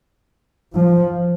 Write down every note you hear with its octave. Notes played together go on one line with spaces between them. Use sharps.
F3